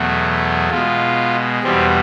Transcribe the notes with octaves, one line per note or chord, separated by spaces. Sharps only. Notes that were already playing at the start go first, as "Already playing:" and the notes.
Already playing: E2 B2 F#3 A3
B2 G#3 F4
E2 B2 G3 C4